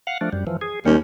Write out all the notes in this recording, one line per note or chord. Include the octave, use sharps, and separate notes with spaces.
F5 F#5
F3 A3 D4
F#2 G3
E3 F3
G#4
D#2 G3 C#4